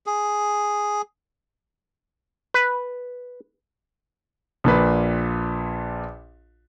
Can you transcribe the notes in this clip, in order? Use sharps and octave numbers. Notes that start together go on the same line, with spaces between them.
G#4
B4
A#1 A#2 B4